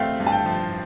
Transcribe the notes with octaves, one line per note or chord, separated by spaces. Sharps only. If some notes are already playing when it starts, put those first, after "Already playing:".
Already playing: A3 C4 F5 G5
G2
A5
G5
F3